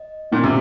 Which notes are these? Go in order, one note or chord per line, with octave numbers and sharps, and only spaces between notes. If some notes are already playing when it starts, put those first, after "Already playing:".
Already playing: D#5
A#2 C#4
C3